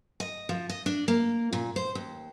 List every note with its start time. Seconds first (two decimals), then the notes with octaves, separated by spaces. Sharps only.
0.20 D#5
0.49 F3
0.69 D#5
0.86 D4
1.08 A#3
1.53 A#2
1.76 C5
1.95 D#2